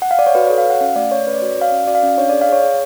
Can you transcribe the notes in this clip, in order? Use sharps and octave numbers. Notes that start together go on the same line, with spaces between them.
F#5
F5
D5
C#5
F#4 B4
A4 C#5
F5
F#4 F#5
C#4 F5
A3 D5
A3 C#5
C#4 B4
D5
C#5
F#4
D5
F#4 F5
C#4
F#4 D5
F5
C#4
D4 C#5
D5
G#4
F5
G#4 C#5
G#4